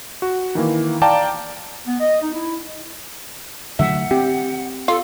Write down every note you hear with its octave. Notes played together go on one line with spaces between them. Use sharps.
F#4
D#3 E3 A#3
D5 F5 G5 A5 A#5 D6
B3
D#5
D#4
E4
D3 F#3 A3 E5 F#5
C4 G4
F4 A4